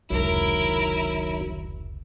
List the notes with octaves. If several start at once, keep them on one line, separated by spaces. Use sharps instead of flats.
F1 C#2 D#3 F#3 E4 A#4